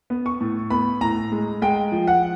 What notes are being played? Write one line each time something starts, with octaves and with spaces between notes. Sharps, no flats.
B3
C#6
A2
B3 B5
A2 A#5
G#3
G#3 G5
F3
F#5